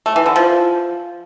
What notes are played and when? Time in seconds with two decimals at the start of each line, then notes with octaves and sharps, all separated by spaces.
0.06 A3
0.16 E3
0.26 D3
0.36 F3